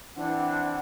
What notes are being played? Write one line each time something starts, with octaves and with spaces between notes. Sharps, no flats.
E3 C4 D4 F#5